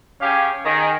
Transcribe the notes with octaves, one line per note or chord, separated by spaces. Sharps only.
C#3 C#4 G4 F5 G5 G#5
D#3 G#4